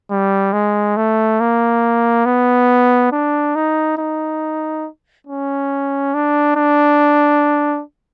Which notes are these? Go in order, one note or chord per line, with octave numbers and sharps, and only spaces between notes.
G3
G#3
A3
A#3
B3
D4
D#4
D#4
C#4
D4
D4